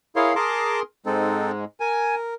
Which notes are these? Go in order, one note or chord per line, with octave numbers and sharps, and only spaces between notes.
E4 G#4 A#4 C#5 F5 C6
G#4 A#4 A5 A#5 C6 D6
G#2 G#3 C4 D#4 A4
A#4 G#5